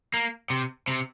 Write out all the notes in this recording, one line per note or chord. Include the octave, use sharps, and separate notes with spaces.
A#3
C3
C3